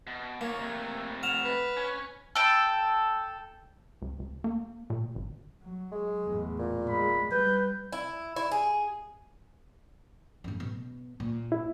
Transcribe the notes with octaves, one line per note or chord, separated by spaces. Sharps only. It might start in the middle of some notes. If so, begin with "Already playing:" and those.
B2
D#3 A#3 C#5
C3 A3 G#6
F#5 F6 E7 F7
B4
C#4 C#5
A4 G5
C#2
C#2
A#3
A#2
G#1
F#3
G#3
E2 A2
A#2
G#3 B5
G3 B4 G6
E4
E4
G#4
A1 F#2
B2
A#2
E4